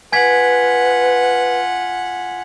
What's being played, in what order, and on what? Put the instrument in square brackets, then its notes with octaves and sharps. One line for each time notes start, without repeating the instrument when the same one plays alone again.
[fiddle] F4 F#5 [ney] B4 [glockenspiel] G#5 G#6 B6